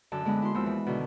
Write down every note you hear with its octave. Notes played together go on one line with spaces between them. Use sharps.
F#2 D3 A5 E6
D3 G#3 B3
E4 C6
D#2 F3 B3 E4 E6
E3
B2 D3 D#3